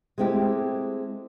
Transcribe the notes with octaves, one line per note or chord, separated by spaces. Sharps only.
G#3 A3 C4 E4 G4